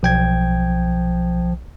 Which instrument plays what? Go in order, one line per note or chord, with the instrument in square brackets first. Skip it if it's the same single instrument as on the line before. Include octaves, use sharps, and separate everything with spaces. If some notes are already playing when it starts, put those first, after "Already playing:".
[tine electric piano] B1 G5 G#6 [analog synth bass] F3